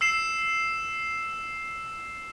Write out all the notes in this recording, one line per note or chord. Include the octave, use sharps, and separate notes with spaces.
E6 C7 E7